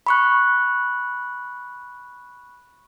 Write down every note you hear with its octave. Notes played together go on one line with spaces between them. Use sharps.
B5 C#6 F#6